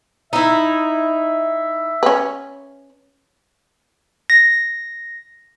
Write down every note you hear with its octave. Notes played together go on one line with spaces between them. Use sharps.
D#4 E4 E5
C#4 B4
A#6